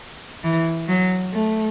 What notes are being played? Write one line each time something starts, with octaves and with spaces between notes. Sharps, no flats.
E3
F#3
A3